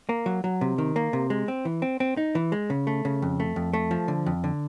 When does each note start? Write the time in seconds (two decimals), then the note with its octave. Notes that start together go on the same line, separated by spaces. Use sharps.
0.09 A#3
0.26 F#3
0.44 F#3
0.61 C3
0.78 D#3
0.96 A#3
1.13 C3
1.30 G#3
1.48 C4
1.65 E3
1.82 C4
2.00 C4
2.17 D#4
2.35 E3
2.52 G#3
2.70 C#3
2.87 A3
3.05 C#3
3.22 F2
3.40 A3
3.56 F2
3.73 A3
3.91 F3
4.08 D3
4.26 F2
4.44 D3